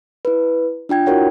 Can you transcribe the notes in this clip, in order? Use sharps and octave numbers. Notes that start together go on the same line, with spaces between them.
E4 B4
D4 F4 G5 G#6
E4 F#4 A#4 C#5 F#5